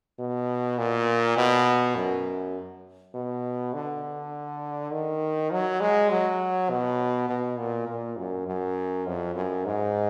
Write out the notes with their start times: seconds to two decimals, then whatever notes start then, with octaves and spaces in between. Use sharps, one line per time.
0.19 B2
0.78 A#2
1.37 B2
1.96 F#2
3.14 B2
3.74 D3
4.92 D#3
5.51 F#3
5.81 G#3
6.10 F#3
6.70 B2
7.29 B2
7.58 A#2
7.88 A#2
8.17 F#2
8.47 F#2
9.06 F2
9.36 F#2
9.65 G#2